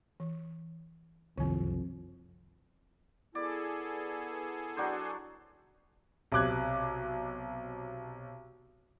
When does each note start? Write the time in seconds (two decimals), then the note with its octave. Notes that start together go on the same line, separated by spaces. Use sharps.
0.20 E3
1.38 F#1 C2 F2 D#3 C4
3.35 B3 E4 G#4 A4 D5
4.77 F#3 D4 C5
6.32 B1 C3 D6 F#6 G#6